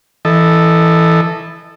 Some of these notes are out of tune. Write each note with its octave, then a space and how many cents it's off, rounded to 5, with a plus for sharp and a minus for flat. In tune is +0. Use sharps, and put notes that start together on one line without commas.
E3 +0 A4 +0 D#5 -25